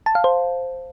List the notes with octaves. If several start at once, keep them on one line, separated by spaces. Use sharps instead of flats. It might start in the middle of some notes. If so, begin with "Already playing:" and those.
A5
F5
C5